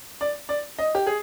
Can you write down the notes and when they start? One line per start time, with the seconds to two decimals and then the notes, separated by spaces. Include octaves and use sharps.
0.21 D5
0.49 D5
0.79 D#5
0.95 G4
1.06 G#4